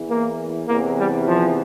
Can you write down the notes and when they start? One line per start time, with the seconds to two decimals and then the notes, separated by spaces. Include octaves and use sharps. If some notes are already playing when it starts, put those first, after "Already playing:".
Already playing: E2 E3
0.09 A#3
0.67 E2 C3 E3 A#3
0.96 G3
1.26 F3